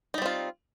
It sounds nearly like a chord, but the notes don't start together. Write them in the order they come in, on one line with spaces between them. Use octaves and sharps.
D#4 G3 C4 F4